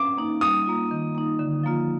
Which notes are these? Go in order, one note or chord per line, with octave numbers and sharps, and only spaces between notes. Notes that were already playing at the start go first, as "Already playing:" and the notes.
Already playing: D6
A#3 D#4
G3 D#6
A#3 F4
D#3
A#3 D#4
D3
F3 A#3 F4